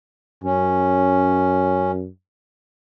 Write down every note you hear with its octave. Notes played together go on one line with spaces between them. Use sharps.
F#2 C#4